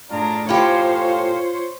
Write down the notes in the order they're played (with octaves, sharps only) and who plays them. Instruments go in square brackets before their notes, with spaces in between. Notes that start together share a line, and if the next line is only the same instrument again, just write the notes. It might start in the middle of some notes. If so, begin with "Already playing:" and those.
[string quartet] A2 D4 [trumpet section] F4 G#4 A#5
[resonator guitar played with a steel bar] A2 C#4 G4 [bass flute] F4 [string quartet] C5 C#5 [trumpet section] F5